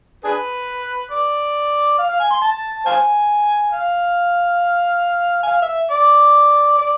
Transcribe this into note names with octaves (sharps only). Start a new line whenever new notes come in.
D4 G#4 B4
D5
F5
F5
G#5
C6
A5
C5 F5 G#5
F5
G#5
F5
E5
D5
D5